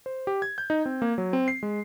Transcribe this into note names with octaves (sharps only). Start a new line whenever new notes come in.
C5
G4
G#6
G6
D#4
C4
A#3
F#3
C4
C7
G#3